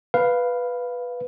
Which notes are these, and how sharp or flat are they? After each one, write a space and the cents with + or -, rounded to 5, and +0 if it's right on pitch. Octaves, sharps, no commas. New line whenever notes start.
B4 +0 F5 +0